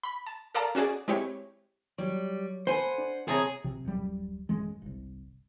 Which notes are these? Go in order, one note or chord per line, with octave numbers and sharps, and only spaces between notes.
B5
A5
A4 A#4 D5 F5 A5 A#5
C#4 F#4 G#4 D5
G#3 C4 E4 G4 C#5
F#3 G3 C#5
A4 C5 F#5 G#5 B5
D4
C3 G#4 C#5 A5 A#5
A#1 C3
D1 F#2 G3
A1 F#2 E3 G#3
G1 C2